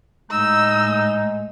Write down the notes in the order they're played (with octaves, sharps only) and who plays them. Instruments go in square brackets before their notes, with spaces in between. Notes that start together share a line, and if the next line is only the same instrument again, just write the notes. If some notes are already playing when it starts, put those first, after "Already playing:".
[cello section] A2 [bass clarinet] G#3 [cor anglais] D#4 [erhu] E6